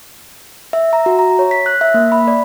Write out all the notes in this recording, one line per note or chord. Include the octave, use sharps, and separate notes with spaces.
E5
A#5
F#4
A#5
C#5
B6
F#6
E5
A#3
B5
D5